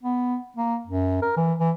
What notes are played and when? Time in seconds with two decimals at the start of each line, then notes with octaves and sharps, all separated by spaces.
0.03 B3
0.57 A#3
0.87 F#2
1.22 A#4
1.37 E3
1.59 E3